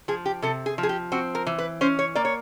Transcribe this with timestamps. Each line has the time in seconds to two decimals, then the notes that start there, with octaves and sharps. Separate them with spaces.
0.08 F3 G#4
0.26 G4
0.42 C3 A4
0.66 G#4
0.78 F3
0.83 G#4
0.89 G4
1.12 C4 F#4
1.35 A#4
1.47 E3
1.58 B4
1.81 C#4 C5
1.99 C#5
2.15 A#3 D5
2.25 C#5